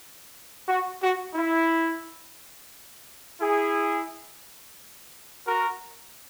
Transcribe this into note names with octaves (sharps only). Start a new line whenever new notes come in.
F#4
F#4
E4
E4 G#4
F#4 A#4